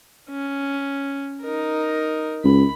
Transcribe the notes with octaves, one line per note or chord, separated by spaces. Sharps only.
C#4
D#4 A#4
C#2 B5